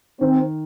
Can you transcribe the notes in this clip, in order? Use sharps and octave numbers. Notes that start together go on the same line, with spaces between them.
D#3 C4